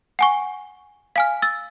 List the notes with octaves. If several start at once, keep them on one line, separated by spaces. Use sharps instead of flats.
F#5 G#5 C#6
F5 G#5 F6
E6 A6